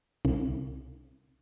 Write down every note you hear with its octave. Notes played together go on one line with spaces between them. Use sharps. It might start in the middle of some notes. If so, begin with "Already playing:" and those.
C2